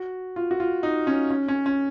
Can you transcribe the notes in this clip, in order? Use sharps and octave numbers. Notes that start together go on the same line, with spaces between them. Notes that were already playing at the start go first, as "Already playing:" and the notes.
Already playing: F#4
F4
F#4
F4
D#4
C#4
C#4
C#4
C#4